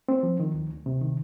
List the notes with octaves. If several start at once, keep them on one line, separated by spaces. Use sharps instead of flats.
C4
F3
D#3
D2
D2
C3
D#3